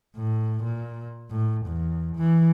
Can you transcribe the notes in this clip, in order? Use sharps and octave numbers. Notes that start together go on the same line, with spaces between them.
A2
A#2
A2
E2
E3